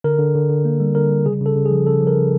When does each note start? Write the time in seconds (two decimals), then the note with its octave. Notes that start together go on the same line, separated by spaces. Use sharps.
0.04 D3 A#4
0.19 D3
0.35 D3
0.50 D3
0.65 A#3
0.80 G3
0.95 D3 A#4
1.10 G3
1.26 C#3 G#4
1.40 C#3
1.46 A4
1.55 C#3
1.65 G#4
1.71 F3
1.86 C#3 A4
2.01 F3
2.07 A#4
2.17 C#3